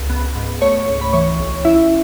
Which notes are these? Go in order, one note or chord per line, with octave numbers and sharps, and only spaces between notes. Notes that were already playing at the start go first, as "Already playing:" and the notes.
Already playing: C#2
B3
G#2
A3 C#5 C#6
C#2
B5
E3 C#5 C#6
B1
C#4 E4 E5